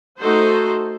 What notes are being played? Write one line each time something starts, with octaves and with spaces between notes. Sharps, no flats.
A3 D#4 F#4 A4 C5